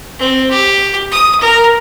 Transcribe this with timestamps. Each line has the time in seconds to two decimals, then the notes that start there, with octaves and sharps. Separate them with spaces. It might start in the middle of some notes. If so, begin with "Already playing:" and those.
0.19 C4
0.51 G4
1.12 D#6
1.41 A#4